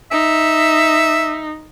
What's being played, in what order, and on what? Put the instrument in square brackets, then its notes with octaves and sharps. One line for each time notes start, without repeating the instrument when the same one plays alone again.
[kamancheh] D#4 [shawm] E5